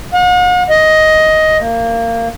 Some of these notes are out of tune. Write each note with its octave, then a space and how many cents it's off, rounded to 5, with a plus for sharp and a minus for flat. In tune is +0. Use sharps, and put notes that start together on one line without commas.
F#5 -45
D#5 +10
A#3 -20